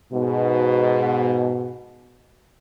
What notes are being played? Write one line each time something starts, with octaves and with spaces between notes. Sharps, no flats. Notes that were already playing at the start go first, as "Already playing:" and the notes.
G#2 B2